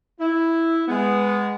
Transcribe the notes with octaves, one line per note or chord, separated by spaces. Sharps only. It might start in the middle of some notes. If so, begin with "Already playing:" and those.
E4
G#3 B3